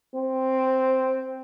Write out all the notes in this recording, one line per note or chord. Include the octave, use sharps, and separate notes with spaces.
C4